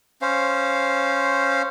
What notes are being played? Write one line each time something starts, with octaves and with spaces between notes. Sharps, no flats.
C#4 C5 F5